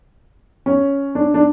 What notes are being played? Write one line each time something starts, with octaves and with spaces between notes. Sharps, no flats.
C#4
D4
D4